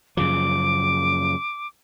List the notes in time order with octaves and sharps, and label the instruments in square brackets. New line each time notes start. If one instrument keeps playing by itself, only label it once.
[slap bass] F#2 C#3 F3 [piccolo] D6